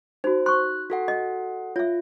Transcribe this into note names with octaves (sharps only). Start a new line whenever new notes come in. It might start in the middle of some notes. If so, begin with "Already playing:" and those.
D#4 F#4 C5
C6 C#6 F#6
F#4 A4 F#5
D#5
F4 C#5 E5